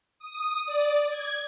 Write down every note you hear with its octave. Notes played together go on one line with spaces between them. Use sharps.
D#6
D5
G#6